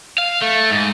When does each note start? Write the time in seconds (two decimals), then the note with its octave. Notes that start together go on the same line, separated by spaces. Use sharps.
0.18 F5
0.42 A3
0.71 G#2